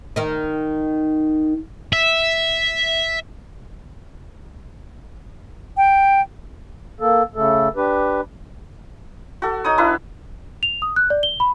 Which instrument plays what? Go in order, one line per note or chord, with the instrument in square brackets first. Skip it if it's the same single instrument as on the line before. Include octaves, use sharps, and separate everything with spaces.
[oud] D#3 D#4
[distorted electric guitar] E5
[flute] G5
[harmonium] A#3 A4
C#3 A3 A4
D4 G4 B4
[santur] F#4 A4
D#4 C#5 D#6
D4 E4 B4
[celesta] F7
D#6
F#6
D5
G7
B5